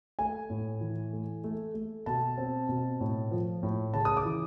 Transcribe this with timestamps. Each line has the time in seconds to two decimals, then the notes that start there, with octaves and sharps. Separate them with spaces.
0.19 A3 G#5
0.50 A2
0.80 E3
1.13 A3
1.44 A3
1.74 A3
2.06 B2 A5
2.38 C4
2.69 B2
3.00 A2
3.31 F3
3.63 A2
3.94 C#3 A5
4.05 D#6
4.17 D6
4.25 E3